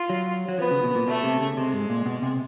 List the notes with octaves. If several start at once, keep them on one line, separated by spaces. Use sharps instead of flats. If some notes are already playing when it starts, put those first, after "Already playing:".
Already playing: F4
F#3
F#3
F3 B3
C#3
B2
A#2
B2 A3
C3
C#3
C3 G#3
G#2
A#2
B2
C3